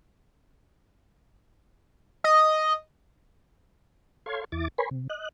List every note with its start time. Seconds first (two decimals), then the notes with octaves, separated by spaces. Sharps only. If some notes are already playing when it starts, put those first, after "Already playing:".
2.24 D#5
4.26 A4 C#5 F5 C6 G#6
4.52 E2 E4 D6 A6
4.78 A#4 B4 C#5 G#5 B5 C6
4.91 C3
5.10 D#5 F#6